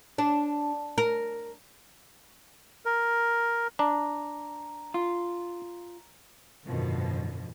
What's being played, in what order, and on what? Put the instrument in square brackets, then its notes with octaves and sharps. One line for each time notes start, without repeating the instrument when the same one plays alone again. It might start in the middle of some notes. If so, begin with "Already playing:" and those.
[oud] D4
A#4
[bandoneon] A#4
[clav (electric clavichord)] D4 [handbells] A#5
[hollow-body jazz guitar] F4
[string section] G#1 F#2 B2 D3 D#3 F3